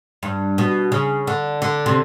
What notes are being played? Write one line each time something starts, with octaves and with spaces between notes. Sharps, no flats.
G2
B2
C#3
D3
D3
C3